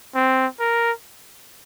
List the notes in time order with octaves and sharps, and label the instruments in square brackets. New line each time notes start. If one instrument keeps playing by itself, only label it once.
[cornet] C4
A#4